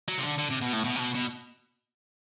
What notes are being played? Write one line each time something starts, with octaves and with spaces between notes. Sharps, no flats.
F#3
C3
D3
D3
C3
B2
A2
B2
C3
B2
B2